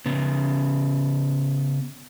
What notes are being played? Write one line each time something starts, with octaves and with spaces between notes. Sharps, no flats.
C#3 B3